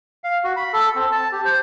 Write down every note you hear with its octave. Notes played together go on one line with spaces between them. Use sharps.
F5
F#4
B5
A4
C4
A5
G4
C5